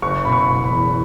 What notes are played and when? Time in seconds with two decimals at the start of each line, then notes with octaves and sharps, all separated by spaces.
0.02 F#1 C#6
0.25 B2 B5
0.32 C#6
0.48 F#1
0.64 B5
0.70 E2